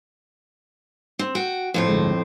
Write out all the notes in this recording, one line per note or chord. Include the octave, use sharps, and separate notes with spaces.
C4
F#4 G5
F2 A2 C4
G1 D2 G#3